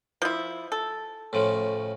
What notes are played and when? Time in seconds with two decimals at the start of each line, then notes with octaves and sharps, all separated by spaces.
0.22 F3 E4
0.72 A4
1.33 A2 C#3 F3